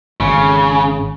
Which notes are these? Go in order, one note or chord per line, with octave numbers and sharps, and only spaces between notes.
G#1 C#3